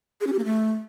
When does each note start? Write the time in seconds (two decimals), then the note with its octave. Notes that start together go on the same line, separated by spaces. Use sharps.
0.21 G#4
0.27 C#4
0.33 G4
0.39 A#3
0.45 A3